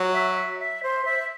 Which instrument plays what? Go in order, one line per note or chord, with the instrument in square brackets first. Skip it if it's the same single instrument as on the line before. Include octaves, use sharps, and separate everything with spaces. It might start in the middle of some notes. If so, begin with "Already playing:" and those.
Already playing: [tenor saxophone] F#3
[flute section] E5
E5
E5
C5
E5